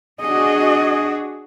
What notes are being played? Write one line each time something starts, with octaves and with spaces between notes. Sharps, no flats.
D4 F#4 G#4 D#5